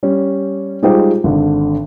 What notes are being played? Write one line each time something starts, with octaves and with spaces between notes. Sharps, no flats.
G3 C#4
G3 G#3 D#4 F4 G4 C5
G#1 D3